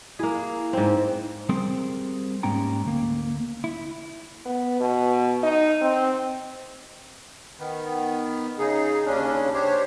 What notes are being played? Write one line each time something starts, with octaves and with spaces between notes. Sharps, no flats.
A#3 E4 G#4
G#2 C4
G3 C4 G#4 A#4 C5
G#2 G3 A#3 C#4 G5 A#5
D2 A#3
E4
B3
B2
D#4
C4
D#3 B3
C#3 D#4 G#4
D#2 C#3 C#4 D4
D4 G4 C5 C#5